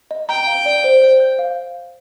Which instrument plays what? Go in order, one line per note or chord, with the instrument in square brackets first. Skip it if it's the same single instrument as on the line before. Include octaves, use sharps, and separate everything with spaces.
[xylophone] D#5
[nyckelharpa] G5 [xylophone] A#5
[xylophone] F5
D5
C5
C5
G6
F5